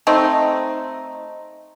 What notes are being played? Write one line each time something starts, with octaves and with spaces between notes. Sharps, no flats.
A3 C4 D#4